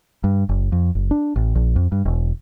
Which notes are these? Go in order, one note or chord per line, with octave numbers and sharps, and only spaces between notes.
G2
F#1
F2
F#1
D4
A1
A#1
F2
G2
E1